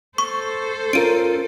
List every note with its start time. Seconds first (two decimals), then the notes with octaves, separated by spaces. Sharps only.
0.18 A4 C5 C#6
0.93 C#4 F4 A#4 D7 D#7